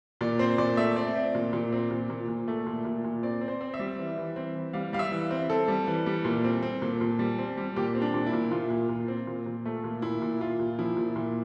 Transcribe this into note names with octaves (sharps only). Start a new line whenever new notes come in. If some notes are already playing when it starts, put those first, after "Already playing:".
A#2 D5
C4 C5
A#2 D5
A3 E5
C4 D5
C4
A#2
A#2
C4
A#2
A#2
A#2
A3
A#2
A#2
A#2
C4 D5
C4
C5
C4
E5
G3
E3
E3
C4
E3
G3 F5
G3 F5
E5
E3
C4
C4 A4
G3
E3
G3
A#2
C4
C4
A#2
A#2
G3
C4
G3
A#2 G4
C4
D4
A#2
E4
A#2
A#2 F4
A#2
A#2
C4
A#2
A#2
A3
A#2
A#2 E4
A#2
A#2 F4
A#2
F3 E4
A#2
A#2